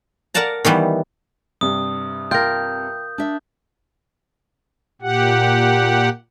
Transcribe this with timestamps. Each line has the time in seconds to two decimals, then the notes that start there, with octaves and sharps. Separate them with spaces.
0.34 A#4 D5 F#5 A5 A#5
0.65 D#3 E3 G3 B3
1.61 G2 C3 G3 D#6
2.31 F4 A#4 G5 G6
3.18 D4 E5
5.02 A#2 G4 F#5